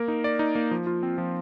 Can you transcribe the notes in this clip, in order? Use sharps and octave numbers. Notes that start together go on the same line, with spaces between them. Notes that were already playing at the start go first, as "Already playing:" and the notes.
Already playing: A#3 A#4
D#4
D5
D#4
A#3
F3
F4
C4
F3